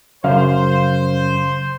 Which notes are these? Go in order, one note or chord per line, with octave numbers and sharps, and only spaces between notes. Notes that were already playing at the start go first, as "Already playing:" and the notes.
F#2 C#3 C5 F5